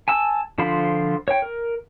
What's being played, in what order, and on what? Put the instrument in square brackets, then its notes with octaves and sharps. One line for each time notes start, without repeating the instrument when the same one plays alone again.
[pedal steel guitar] G#5 A5 E6
D3 F3 F4 C5 B5
C#5 G5
A#4